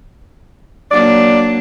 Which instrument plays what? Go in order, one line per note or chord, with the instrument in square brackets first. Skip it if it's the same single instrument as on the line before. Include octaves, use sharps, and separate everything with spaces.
[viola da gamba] F#3 A#3 D4 [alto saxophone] D5